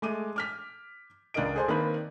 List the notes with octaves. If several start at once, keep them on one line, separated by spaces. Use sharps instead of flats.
G#3 A3 D6 D#7
D6 F6 B6
C#2 D4 A#4 D#5 D7
G#4 A4 C5 D5 G#5
D#3 A#3 C4 D4 B4